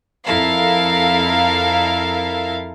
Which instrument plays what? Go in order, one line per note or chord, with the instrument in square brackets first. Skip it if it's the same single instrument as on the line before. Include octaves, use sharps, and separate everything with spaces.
[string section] F2 E4 A4 A#4 F5